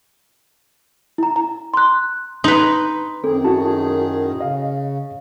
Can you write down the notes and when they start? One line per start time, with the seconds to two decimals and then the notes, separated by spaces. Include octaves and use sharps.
1.18 E4 A#5
1.36 A#5
1.74 C6 F#6
2.44 D#4 B4 C6 F#7
3.24 F#2 D#3 C4 G#4 A4
3.44 E4 F#4 A5
4.41 C#3 D#5 F5